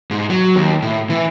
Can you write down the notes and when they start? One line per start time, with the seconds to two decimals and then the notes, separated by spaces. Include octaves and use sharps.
0.11 G#2
0.30 F#3
0.56 D#2
0.82 A2
1.10 E3